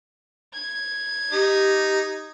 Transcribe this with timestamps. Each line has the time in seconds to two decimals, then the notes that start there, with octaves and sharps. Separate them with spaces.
0.54 G#6
1.32 D#4 G4